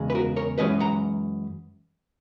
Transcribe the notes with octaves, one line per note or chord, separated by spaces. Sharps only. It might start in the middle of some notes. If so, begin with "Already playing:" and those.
Already playing: E2 C#3 G#3
B4
F#4 A#4
A#4 C#5
F#2 E3 G#3 C#4 B4 D#5
F#5 A#5